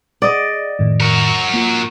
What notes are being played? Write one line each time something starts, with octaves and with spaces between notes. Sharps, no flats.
G#4 D5 D#5 F#5
F2 A2 D#3
F#4 A#4
A#3 F4